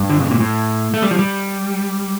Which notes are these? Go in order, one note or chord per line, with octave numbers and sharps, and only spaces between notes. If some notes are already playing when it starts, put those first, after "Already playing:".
Already playing: G2
D3
C#3
A#2
A2
A3
G3
F3
G3